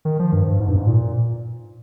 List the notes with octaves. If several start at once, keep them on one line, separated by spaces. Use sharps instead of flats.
D#3
F3
G2
G2
G#2
G2
G#2
A#2